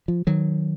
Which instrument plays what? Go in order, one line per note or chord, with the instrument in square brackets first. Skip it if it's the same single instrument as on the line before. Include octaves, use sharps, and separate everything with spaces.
[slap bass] F3
D#3 F#3